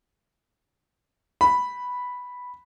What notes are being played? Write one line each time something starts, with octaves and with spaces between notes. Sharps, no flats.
B5